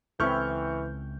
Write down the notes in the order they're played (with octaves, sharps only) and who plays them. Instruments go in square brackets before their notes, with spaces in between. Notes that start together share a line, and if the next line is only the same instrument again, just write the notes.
[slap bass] C#2 [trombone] E3 [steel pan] C4 E4 A4 [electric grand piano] C#6 F6 G6